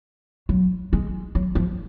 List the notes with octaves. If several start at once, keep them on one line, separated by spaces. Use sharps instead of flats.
F#3
G#3
F#3
F3